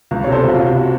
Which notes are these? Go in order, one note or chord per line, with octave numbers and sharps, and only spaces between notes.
C#2
C3 C#5
A4 C5
C#2 F#4
F4
C3
F#4